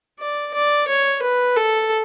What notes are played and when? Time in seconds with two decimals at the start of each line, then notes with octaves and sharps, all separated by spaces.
0.19 D5
0.54 D5
0.88 C#5
1.22 B4
1.56 A4